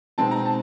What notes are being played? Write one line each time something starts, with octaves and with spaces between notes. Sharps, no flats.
B2 G#3 C4 D#4 A5
A#5
A5